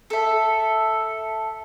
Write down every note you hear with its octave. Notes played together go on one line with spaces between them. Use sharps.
A4 E5